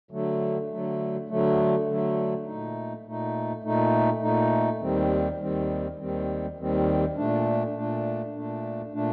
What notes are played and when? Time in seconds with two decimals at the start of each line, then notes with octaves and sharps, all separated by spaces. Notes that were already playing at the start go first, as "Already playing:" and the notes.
0.11 D3 F#3 A3
0.69 D3 F#3 A3
1.28 D3 F#3 A3
1.87 D3 F#3 A3
2.46 A#2 A3 D#4
3.05 A#2 A3 D#4
3.63 A#2 A3 D#4
4.22 A#2 A3 D#4
4.81 D#2 D#3 G3 C4
5.40 D#2 D#3 G3 C4
5.99 D#2 D#3 G3 C4
6.57 D#2 D#3 G3 C4
7.16 A#2 A3 D4
7.75 A#2 A3 D4
8.34 A#2 A3 D4
8.93 A#2 A3 D4